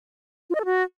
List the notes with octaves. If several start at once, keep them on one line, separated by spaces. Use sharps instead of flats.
F4
D#5
A4
F#4